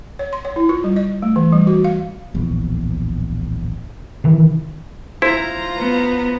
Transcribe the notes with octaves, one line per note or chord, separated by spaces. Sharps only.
C#5
C6
C#5
E4
F4
G3
D#5
A3
E3
G3
F#4
F5
D1 A#1 E2
C3 D#3 E3
E4 F4 C5 A#5
B3